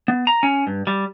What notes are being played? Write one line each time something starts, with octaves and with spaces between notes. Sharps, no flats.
B3
A#5
C#4
G2
G3